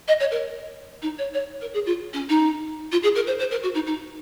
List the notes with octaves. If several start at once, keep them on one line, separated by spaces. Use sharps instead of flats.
D#5
C#5
A#4
D#4
C#5
C#5
A#4
G#4
F4
C#4
D#4
F4
G#4
A#4
C5
C5
A#4
F#4
D#4
D#4